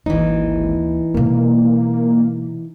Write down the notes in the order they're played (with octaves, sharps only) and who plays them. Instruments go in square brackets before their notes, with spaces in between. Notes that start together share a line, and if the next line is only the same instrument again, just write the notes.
[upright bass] D1 A#3 [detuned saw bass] G#1 [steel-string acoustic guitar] E3 D#4
[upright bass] B2 G#3 [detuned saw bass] A#3